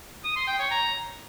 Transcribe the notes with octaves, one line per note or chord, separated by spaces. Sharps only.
D#6
C6
G5
C#5
A#5